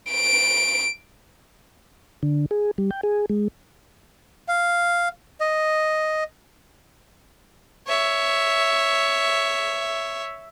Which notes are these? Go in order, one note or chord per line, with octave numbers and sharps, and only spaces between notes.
D7
D3
G#4
G3
G5
G#4
G#3
F5
D#5
C#5 E5